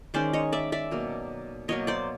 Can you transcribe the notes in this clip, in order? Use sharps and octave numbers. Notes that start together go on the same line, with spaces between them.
D#3 G#3 C#4 C5 D5
C#5 D#5
D5 E5
D5 E5
B2 F#3 A#3
B2 F#3 A#3 C#5 D#5
C5 D5